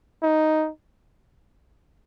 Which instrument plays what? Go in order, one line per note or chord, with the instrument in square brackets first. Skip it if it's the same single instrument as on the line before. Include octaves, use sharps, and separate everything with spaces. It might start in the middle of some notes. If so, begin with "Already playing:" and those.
[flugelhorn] D#4